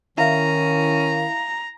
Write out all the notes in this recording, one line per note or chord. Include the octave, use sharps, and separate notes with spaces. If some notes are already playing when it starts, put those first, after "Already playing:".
D#3 C#4 E4 F5 A#5